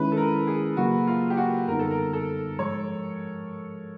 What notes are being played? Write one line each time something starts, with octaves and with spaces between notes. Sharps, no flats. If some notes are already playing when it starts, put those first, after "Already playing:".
Already playing: D#3 G#3 C#4 E4 B4
A4
A#4
G#4
C#3 F#3 A#3 F#4
F4
G4
F#4
F#2 D3 G3 B3 D#4 A#4
A4
A#4
A4
G#2 F3 G#3 C#5